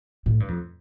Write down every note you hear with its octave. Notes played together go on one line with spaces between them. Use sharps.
A2
G2
F2